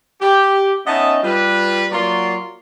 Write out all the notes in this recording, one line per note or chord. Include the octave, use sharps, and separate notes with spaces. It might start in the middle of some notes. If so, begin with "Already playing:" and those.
G4
B3 C#4 D#4 D#5 E5 A5
G3 F4 B4
F#3 A#3 F4 F#4 D5 C6